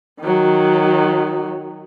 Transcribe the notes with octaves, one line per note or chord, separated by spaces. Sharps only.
D#3 F#3